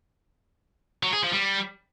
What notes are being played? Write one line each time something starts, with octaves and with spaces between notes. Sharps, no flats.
F#3
G#4
F3
G3